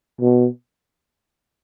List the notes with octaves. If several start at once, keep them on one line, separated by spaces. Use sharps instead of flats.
B2